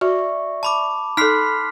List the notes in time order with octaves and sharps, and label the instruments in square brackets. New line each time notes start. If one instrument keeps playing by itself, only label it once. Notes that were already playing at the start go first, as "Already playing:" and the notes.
[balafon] F#4 [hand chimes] D5 E5 C#6
[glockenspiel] A5 B5 D6
[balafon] D#4 A4 [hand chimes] B5 C6 F#6 [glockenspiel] F6 B6 C7